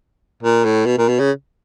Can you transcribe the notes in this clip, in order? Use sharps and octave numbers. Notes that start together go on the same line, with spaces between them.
A#2
A2
B2
A#2
B2
C#3